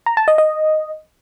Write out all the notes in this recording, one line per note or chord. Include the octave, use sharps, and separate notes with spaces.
A#5
A5
D#5
D#5